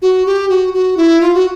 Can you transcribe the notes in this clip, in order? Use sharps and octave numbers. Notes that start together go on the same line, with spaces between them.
F#4
G4
F#4
F#4
E4
F4
F#4